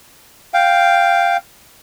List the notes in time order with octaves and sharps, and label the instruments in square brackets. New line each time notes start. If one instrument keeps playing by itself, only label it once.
[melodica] F5 G5